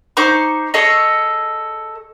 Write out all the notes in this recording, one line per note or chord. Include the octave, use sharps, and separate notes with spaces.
D#4 C5 C#6 D6
G#4 A4 C#5 D#5